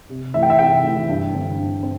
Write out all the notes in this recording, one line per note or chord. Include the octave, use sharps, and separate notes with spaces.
C3
E3 A3 E5
G5
E5
C3 G5
E3 A3
G2
D3 C4
G2
C4